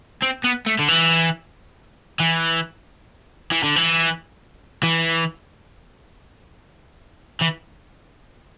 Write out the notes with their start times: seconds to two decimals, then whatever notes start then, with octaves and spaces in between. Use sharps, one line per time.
0.22 C4
0.44 B3
0.66 A3
0.79 D3
0.88 E3
2.20 E3
3.51 E3
3.63 D3
3.76 E3
4.83 E3
7.42 E3